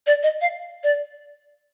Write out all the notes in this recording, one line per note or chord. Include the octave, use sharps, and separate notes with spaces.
D5
D#5
F5
D5